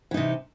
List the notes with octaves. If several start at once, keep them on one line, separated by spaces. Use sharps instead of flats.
C3 E3 D#4